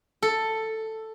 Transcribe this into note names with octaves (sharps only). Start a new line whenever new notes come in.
A4